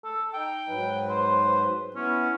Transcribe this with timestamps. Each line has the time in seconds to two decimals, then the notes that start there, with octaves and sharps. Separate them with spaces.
0.04 A4
0.34 D#4 G5
0.69 G#2 F#3 B4
1.09 C5
1.95 B3 C#4 E4